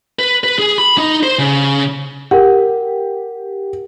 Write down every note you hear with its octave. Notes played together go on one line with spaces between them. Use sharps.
B4
B4
G#4
B5
D#4
C5
C#3
G4 A#4 F#5